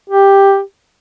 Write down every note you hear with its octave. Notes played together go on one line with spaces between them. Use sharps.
G4